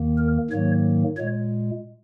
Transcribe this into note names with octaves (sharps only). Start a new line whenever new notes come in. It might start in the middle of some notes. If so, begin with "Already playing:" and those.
Already playing: D#2 D#3 A#3
A#4
G#2 D#3 F#3 A#3 C#5
A#2 G#3 C#5